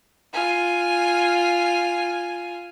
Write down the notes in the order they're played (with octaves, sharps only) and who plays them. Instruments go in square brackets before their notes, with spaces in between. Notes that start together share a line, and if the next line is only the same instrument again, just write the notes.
[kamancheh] F4 G#5